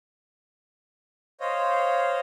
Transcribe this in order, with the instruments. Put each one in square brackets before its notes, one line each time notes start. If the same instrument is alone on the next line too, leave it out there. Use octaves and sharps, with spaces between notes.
[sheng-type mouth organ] C5 C#5 D#5 F5